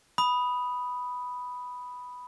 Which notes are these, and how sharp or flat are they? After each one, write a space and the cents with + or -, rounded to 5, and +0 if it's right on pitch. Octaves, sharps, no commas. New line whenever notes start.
B5 +0 D#6 +0